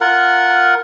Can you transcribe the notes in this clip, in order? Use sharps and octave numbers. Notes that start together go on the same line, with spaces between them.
F4 A#4 F#5